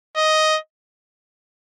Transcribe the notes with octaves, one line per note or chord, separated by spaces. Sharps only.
D#5